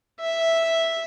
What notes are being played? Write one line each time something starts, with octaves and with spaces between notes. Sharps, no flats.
E5